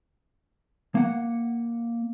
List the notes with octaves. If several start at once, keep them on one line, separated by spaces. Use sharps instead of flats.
A#3 F#5